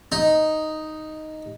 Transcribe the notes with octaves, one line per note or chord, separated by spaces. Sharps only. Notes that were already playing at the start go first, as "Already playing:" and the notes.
D#4